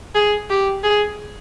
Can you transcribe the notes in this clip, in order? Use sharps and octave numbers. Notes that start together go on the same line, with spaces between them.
G#4
G4
G#4